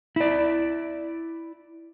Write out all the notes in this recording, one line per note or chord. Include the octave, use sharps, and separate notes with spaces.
E4 D5